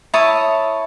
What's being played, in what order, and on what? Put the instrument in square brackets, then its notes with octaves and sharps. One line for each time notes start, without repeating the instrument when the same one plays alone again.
[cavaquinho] E4 C#5 A5 D#6